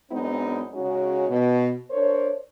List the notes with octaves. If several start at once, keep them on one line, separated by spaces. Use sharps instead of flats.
F#2 G#3 B3 C4 D4 D#4
C#3 G#3 C#4 D#4 F#4
B2
D4 A#4 C5 C#5